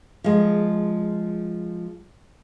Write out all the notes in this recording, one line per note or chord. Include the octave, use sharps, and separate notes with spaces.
F3 G#3